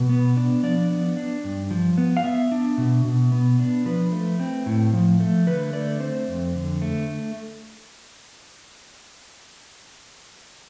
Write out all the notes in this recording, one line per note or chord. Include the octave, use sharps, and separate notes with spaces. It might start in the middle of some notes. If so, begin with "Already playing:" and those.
Already playing: B2 B4
B3
D4
F3 D5
B3
D4
G2
F3
B3
F5
B3 E5
D4
B2
B2
B3
D4
F3 B4
A3
C4
A2
F3
A3
D3 B4
A3 D5
C4 C5
F2
D3
A3